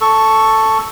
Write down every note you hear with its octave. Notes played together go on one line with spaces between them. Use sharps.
A4 C#6